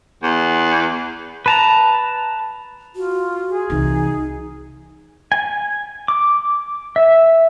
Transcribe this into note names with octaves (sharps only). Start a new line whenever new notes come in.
E2
B4 A5 A#5
F4 F#4
G#4
C2 E3 D#4
G#5
D6
E5